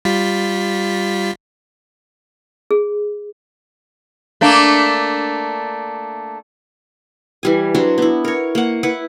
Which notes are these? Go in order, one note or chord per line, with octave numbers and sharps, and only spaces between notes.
G3 F4 B6
G#4
A3 A#3 D4
E3 G3 G#5
F#3 D4 C5
B3 E4
A#4 C#5
A#3 F#5
E4 B4 F#5